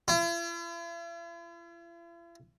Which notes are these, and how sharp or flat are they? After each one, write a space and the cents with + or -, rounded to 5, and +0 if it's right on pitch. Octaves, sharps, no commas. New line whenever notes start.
E4 +45